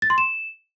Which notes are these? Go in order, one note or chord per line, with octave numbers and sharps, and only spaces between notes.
A6
C6
E7